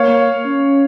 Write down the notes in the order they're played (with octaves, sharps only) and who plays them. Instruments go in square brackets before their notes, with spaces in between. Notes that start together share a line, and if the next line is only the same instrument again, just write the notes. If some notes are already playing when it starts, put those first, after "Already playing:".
Already playing: [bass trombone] A#3 [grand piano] C#5 F5
[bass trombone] C#4